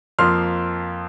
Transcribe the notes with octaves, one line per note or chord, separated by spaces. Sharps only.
F2 F3 A#3 C6 F6